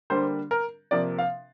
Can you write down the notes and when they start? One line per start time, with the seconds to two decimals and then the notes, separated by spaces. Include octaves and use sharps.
0.10 D3 G3 A#3 C5
0.51 A#4
0.91 C3 F3 A#3 D5
1.19 F5